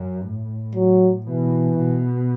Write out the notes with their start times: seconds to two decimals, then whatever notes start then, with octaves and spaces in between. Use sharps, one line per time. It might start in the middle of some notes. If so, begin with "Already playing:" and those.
Already playing: F#2
0.23 A2
0.75 F#3
1.26 B2 E3
1.77 B2